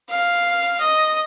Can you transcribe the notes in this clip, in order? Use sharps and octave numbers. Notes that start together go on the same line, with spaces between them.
F5
D#5